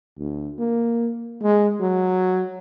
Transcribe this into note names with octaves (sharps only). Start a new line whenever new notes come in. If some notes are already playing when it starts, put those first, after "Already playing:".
D2
A#3
G#3
F#3